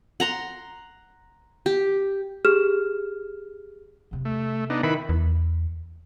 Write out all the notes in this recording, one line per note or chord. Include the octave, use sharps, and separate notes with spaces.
F#5 A#5 C6
G4
G4 G#4 F6 E7
E2 C3
A3
B3 D4 D#4
D#3 E4 B4 B5
E2